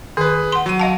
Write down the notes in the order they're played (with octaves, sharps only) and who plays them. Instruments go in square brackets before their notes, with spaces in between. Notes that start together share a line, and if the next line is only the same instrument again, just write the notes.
[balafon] D#3 [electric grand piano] G#4 B4
[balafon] F#5 C6
[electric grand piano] F#3 D#7
[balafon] D#5 F5 A5